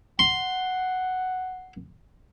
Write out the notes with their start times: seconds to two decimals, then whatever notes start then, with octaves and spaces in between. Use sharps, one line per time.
0.19 F#5 C6